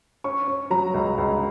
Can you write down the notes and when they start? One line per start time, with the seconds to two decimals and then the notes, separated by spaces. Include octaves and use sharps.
0.24 C#4 C#6
0.48 C#4
0.70 F#3 A#5
0.94 C#2
1.18 C#2